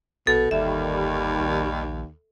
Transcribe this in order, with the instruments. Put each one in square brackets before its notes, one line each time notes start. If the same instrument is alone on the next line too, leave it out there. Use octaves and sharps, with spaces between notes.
[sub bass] A#1 [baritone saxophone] B2 [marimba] A4
[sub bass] G1 [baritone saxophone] D#2 [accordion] D#3 G3 [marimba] E5
[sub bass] A#1